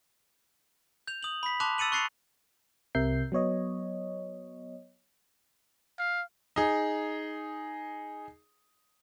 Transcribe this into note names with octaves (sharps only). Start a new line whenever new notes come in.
G6 F7
D#6 F#7
B5 B6
A5 C6 D6 F#6 F7
E6 A6 C#7 D#7 F#7
C#6 F#6 A6 C7 C#7 F7
C2 C3 A#4 E5 G6 C7
F#3 B3 C#5 D#5
F5
D#4 G#4